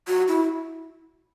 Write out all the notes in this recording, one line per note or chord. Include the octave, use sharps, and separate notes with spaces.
F#4
E4